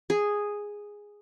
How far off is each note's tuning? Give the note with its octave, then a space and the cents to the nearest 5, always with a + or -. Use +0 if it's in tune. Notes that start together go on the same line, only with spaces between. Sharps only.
G#4 -5